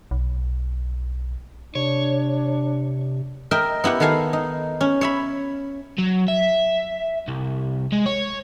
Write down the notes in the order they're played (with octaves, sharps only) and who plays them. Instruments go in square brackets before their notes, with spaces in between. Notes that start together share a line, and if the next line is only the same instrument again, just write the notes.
[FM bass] B1
[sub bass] C3 [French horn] D4 [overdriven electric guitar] C#5
[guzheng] A#4 D#5 E5 G5
B3 E4 G4 F#5
D#3 B3 A4 F5 G#5 A#5
D#4
C#4
C#5 E5 B5
[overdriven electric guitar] F#3
E5
C2
G#3
C#5